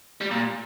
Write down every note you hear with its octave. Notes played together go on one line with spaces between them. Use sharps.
G3
A#2